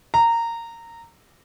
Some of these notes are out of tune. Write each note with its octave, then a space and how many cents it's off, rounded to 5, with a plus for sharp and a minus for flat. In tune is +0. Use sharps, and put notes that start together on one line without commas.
A#5 -15